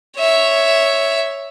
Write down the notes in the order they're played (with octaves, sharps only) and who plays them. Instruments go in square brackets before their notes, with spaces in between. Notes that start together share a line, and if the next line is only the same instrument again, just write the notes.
[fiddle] C#5 E5